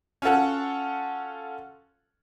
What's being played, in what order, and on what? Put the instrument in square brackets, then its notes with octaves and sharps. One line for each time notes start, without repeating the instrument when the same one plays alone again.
[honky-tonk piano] C#4 F4 F#4 A4 F#5